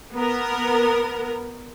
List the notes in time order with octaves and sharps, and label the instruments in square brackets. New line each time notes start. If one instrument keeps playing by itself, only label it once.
[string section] B3 A#4